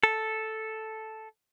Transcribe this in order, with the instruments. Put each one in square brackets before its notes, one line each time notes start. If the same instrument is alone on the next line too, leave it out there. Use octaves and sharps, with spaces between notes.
[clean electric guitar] A4